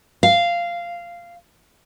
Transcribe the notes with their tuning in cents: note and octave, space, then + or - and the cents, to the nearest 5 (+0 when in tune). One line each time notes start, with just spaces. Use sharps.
F5 -10